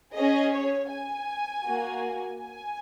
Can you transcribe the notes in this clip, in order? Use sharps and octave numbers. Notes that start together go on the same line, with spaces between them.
C#4 G#4 D#5
C#5
G#5
A#3 F#4
G#5